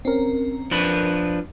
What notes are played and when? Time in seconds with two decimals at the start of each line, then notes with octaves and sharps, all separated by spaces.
0.05 C4 C#4 A#4
0.71 F3 D4 B4